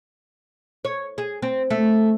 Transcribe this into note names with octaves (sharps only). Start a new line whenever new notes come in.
C#5
G#4
C4
A3